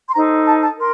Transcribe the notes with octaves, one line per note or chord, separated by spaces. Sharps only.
C6
D#4 A4 C5 A#5
A5
A5
A#4 C6